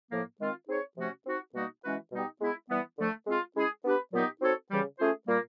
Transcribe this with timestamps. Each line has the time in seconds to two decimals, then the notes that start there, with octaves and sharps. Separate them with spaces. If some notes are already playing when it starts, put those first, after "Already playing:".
0.11 A2 F3 A#3
0.41 D#3 G#3 C4 F4
0.69 C4 D#4 G#4 C#5
0.97 C3 F3 A3 C#4 F#4
1.26 C4 D#4 F#4
1.54 B2 G3 A#3 D#4 F#4
1.84 E3 G#3 C#4 F#4 B4
2.12 B2 G3 B3 D#4 G4
2.41 G#3 B3 E4
2.69 E3 G3 B3
2.98 D3 F3 A3
3.27 G#3 C4 F4
3.56 G#3 C#4 E4 G#4
3.85 B3 D4 G4 B4
4.12 A#2 F#3 B3 D#4 G4
4.42 C4 D#4 F#4 A4 C#5
4.70 C#3 E3 G3
4.98 A3 C#4 F4 G#4 C5
5.27 A#2 G3 A#3